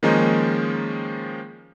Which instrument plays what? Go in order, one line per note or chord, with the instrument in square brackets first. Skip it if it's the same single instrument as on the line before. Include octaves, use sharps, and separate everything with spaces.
[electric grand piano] D#3 F3 G#3 A#3 C#4 D#4